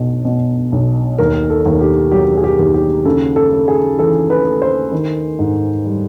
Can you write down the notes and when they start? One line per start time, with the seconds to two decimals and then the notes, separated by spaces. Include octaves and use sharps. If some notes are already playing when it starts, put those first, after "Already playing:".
Already playing: B1 B2
0.25 B2
0.72 B1
1.18 D#2 A#4
1.50 A4
1.66 D#2
1.81 G4
2.12 F#3 G4
2.37 G#4
2.44 G4
2.59 D#2
2.74 G4
3.05 C#3 A4
3.36 A4
3.52 A3
3.68 G#4
3.99 E3 A4
4.30 B4
4.46 A3
4.62 C5
4.92 D#3
5.39 G#2
5.85 G3